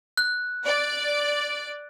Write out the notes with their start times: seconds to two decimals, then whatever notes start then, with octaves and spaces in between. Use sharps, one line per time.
0.17 F#6
0.66 D5